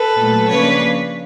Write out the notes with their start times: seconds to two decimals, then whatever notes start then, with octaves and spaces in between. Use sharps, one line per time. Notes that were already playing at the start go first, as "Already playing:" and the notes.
Already playing: A4 B4
0.17 A#2 F#3 A3
0.49 C#3 F3 A#3 D4 B4 C#5